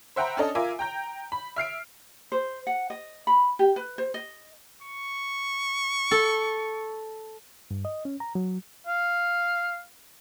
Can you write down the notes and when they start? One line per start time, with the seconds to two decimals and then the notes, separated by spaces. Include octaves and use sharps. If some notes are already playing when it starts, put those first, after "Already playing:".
0.16 C5 E5 F#5 G5 A#5 B5
0.37 C#4 D4 A4 D#5
0.55 F4 A#4 E5 G#5 D6
0.79 G5 A#5 G6
1.32 B5
1.56 E5 F6 C7 D7
2.32 C5
2.67 F#5
2.90 D#5
3.27 B5
3.59 G4
3.76 B4
3.98 C5
4.14 D#5
4.83 C#6
6.11 A4
7.71 G2
7.85 D#5
8.05 C#4
8.20 A#5
8.35 F#3
8.87 F5